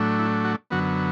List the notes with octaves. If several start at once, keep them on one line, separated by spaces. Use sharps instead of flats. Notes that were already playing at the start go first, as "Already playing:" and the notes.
Already playing: A2 F#3 A3 D4
E4
F#4
F#2 D3 F#3 B3 F#4